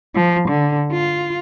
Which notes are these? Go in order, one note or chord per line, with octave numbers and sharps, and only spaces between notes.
F3
D3
F4